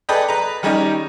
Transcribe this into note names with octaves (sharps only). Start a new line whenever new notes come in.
G#4 A4 B4 D5 D#5 G5
B4 A#5
D#3 G3 C#4 D#4 G4 C#5